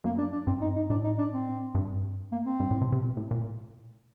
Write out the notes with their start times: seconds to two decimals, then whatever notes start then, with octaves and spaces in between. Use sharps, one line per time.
0.04 F#2 A#3
0.18 D4
0.32 D4
0.47 G2 C4
0.61 D#4
0.76 D#4
0.90 A2 D4
1.04 D#4
1.19 D4
1.32 C4
1.75 G2
2.32 A#3
2.46 C4
2.60 G2
2.71 A2
2.81 C3
2.92 C3
3.03 A#2
3.17 A2
3.31 A#2